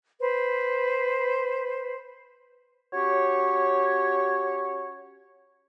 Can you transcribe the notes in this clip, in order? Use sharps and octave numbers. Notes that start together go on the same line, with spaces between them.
B4 C5
C#4 F#4 G4 C#5